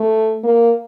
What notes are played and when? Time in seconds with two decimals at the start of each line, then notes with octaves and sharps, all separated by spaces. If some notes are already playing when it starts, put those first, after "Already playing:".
Already playing: A3
0.44 A#3